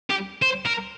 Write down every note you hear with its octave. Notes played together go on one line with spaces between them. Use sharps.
G4
C5
A#4